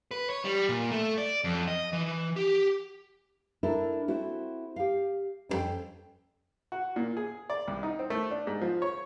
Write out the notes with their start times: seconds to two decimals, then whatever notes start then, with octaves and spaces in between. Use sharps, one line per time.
0.11 B4
0.30 C#5
0.45 G3
0.69 A#2
0.91 A3
1.18 D5
1.44 F2
1.68 D#5
1.93 E3
2.36 G4
3.63 D4 E4 A4 A#4
4.08 C4 E4 F#4
4.76 G4 F5
5.49 F2 C4 C#4 A4 G5
6.72 F#4
6.96 A#2
7.17 G#4
7.50 D5
7.68 C2
7.83 D#4
7.99 C4
8.10 A3
8.31 D4
8.47 G#2
8.61 F3
8.82 C#5